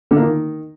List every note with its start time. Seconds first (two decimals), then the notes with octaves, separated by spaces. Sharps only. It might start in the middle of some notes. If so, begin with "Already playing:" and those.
0.11 D3
0.17 A#3
0.22 D#3